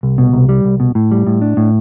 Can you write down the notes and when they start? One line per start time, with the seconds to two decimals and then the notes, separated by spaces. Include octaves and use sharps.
0.03 C2
0.18 B2
0.33 C2
0.49 G3
0.65 C2
0.80 B2
0.95 A2
1.11 G3
1.27 A2
1.41 D4
1.57 A2